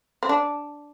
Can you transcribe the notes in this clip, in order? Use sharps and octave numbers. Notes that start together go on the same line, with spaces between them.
C4
D4